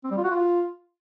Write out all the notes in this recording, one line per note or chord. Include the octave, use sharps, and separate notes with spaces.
C4
G3
F4
F#4
F4